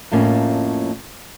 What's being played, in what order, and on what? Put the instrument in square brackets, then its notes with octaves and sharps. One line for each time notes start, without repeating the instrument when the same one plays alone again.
[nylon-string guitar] F2 A2 A#3 C#4